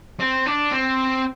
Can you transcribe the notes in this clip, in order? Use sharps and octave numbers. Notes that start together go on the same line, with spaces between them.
C4
D4
C4